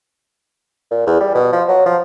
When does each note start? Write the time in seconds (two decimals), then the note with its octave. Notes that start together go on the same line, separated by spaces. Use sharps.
0.91 A#2
1.07 E2
1.20 G3
1.35 B2
1.52 F3
1.69 F#3
1.86 F3